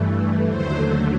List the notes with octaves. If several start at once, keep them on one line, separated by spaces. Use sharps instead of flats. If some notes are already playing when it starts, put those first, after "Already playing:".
Already playing: G2 E3 A3
D#2 D3 F#3 A3 C5